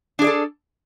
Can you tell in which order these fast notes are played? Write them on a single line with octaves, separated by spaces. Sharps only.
D4 G#4 D5 A4